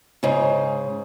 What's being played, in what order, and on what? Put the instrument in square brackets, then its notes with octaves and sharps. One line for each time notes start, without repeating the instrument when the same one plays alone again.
[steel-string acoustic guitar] G#2 C#3